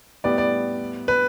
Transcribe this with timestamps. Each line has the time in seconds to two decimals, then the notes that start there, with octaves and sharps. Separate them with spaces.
0.24 A2 G3 B3 D5
0.38 D5
1.08 B4